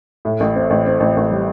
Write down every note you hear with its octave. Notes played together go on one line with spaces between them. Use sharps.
A2
A1
C4
A1
C4
A1
A1
G3